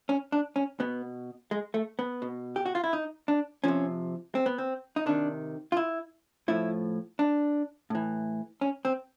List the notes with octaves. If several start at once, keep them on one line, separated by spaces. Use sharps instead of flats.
C#4
D4
C#4
B2 B3
G#3
A3
B3
B2
G4
F#4
F4
E4
D#4
D4
C3 F3 C#4
C4
B3
C4
D#4
C3 D#3 D4
F4
E4
A2 F3 E4
D4
A2 E3
C#4
C4